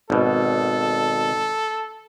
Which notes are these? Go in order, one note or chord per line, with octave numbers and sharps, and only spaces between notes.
G#1 B2 A4